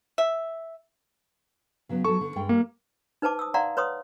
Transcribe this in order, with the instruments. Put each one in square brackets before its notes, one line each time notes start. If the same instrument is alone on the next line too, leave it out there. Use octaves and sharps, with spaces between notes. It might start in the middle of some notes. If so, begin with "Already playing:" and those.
[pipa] E5
[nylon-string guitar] C#3 F#3 B3
[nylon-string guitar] F#3 A4 [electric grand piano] C#6
[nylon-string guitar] D3
G2 G#3 G5
[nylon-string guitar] G3 [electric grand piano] A#3
[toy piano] D#4 B4 C5 A5 D6
D#6 E6
D5 F5 F#5 A#5 C6
B4 C#5 C6 D#6